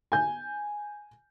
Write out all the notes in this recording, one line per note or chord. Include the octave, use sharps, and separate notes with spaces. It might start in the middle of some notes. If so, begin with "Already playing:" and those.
G#5 G6